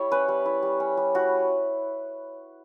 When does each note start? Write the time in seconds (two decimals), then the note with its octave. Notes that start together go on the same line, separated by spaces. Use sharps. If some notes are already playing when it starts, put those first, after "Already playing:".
Already playing: G3 E4 C#5
0.11 C#4 B4
0.28 G3
0.46 E4
0.63 G3
0.80 C#4
0.97 G3
1.15 E4 F#4